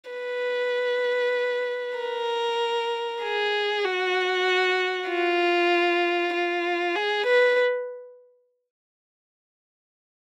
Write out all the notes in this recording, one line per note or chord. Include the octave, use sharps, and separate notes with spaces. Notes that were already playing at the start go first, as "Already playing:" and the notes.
B4
A#4
G#4
F#4
F4
F4
G#4
B4